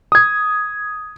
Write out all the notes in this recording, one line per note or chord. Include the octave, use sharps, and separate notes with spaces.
D#6 G#6